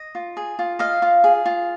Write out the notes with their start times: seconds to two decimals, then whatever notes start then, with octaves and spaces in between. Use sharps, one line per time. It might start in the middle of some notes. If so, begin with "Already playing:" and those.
Already playing: D#5
0.15 F4
0.37 G#4
0.59 F4
0.79 D#5 F5
1.02 F4
1.24 G#4
1.46 F4